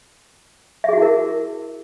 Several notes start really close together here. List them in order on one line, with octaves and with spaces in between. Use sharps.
E5 G#4 F#4 E4 A#4